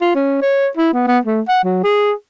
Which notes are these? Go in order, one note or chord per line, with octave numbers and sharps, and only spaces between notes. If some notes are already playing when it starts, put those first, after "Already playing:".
F4
C#4
C#5
E4
B3
B3
A3
F#5
F#3
G#4